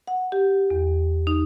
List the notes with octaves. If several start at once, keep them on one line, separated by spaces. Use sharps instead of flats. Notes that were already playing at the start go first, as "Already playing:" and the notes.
F#5
G4
E2
D#4